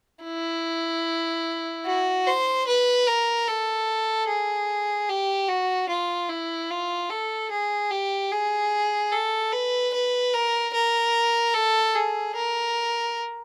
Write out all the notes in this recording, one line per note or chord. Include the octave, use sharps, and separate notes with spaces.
E4
F#4
C5
B4
A#4
A4
G#4
G4
F#4
F4
E4
F4
A4
G#4
G4
G#4
A4
B4
B4
A#4
A#4
A4
G#4
A#4